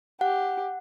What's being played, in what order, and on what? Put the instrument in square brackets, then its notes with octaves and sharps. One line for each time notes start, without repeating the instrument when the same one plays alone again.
[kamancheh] G4 [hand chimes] F#5